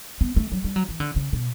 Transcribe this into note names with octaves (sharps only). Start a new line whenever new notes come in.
B3
A3
F#3
G3
F#3
E3
D3
C#3
B2